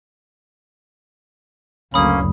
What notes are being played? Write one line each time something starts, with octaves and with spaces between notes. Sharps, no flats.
F#1 D2 A#3 C#4 B5 D#6